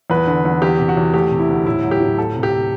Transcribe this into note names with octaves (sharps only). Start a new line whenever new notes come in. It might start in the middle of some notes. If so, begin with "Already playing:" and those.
E2 B4
D3
E2
E2 G4
C3
F#4
E2
A3 G4
C3
E4
D2
A2 E4
F#3
G4
A2
D2 A4
C3
G4